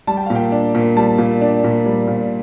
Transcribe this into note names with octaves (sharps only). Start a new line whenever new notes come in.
G3 A5
G5
A#2 F5
G5
D4
A#2
G3 A5
A#2
D4
A#2
G3
A#2